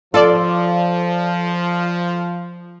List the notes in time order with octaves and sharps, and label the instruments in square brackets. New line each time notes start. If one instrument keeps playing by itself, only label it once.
[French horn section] F3 [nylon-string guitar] F4 [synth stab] A4 D5